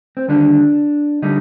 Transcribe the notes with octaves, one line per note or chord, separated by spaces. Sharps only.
C4
D#2 D3 G3 D4
D3 G3 D#4